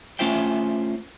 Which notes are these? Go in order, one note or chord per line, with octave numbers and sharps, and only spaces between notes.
A3 C#4 F4 C5 E5 G5